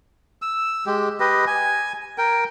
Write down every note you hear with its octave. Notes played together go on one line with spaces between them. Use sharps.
E6
G#3 G4
G4 B4 D#5
G#5
A#4 G5